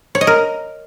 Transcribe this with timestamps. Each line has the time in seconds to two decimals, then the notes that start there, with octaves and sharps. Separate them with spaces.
0.15 C#5
0.21 D#5
0.27 A#4